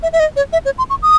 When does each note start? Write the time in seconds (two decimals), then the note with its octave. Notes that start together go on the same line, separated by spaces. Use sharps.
0.03 E5
0.13 E5
0.20 D#5
0.36 C#5
0.53 E5
0.65 C#5
0.78 C6
0.90 C#6
1.02 D#6